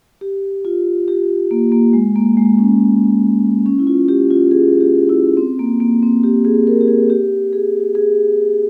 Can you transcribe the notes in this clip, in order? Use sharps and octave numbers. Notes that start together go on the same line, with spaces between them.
G4
F4
G4
A#3
A#3
G#3
A#3
G#3
C#4
C#4
E4
F4
G4
F4
G#4
G4
E4
C4
A#3
A#3
C4
G4
G#4
A#4
G4
G#4
G4
G#4
G#4